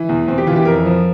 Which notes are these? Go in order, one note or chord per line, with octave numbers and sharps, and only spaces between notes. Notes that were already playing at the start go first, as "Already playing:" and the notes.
Already playing: E3
E2
E2 C4
G4
E3 F4
G4
F2 A#4
F3